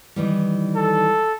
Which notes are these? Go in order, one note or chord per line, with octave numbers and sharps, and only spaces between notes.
D#3 E3 G3
A4